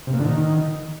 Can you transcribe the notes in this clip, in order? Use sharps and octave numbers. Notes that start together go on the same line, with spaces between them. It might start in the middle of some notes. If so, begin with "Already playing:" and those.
C3
A#2
D3
D#3